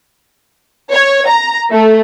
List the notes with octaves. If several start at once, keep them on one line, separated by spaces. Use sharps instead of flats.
C#5
A#5
A3